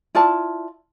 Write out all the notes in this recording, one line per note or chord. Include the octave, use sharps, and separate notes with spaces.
E4 F4 D5 A5